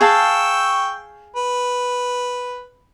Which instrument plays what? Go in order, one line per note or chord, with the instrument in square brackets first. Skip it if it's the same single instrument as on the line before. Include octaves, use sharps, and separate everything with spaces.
[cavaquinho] G#4 F5 A5 [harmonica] G5 C#6 E6
[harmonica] B4